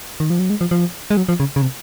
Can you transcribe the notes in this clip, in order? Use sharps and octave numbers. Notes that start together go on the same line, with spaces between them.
D#3
F3
F#3
G#3
F3
F3
G#3
F#3
F3
C#3
C#3
C3